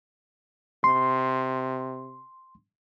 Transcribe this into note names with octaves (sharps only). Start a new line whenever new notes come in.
C3 C6